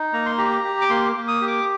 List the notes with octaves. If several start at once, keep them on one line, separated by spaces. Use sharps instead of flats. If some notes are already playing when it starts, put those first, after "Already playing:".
Already playing: D#4
A#3 A#5
C6
G4 A#5
G4
D6
A#3 C6
A#3
D#6
G4
D6